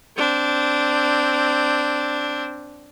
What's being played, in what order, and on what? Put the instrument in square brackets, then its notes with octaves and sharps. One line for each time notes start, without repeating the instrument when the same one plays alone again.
[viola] C4 D4